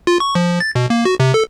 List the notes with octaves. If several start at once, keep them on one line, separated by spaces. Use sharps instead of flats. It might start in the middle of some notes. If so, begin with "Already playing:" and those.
F4
C#6
F3
A6
B2
A#3
F#4
C3
A4